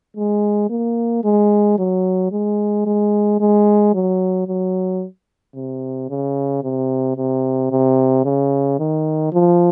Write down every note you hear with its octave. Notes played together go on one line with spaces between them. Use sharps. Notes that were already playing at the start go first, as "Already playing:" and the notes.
G#3
A#3
G#3
F#3
G#3
G#3
G#3
F#3
F#3
C3
C#3
C3
C3
C3
C#3
D#3
F3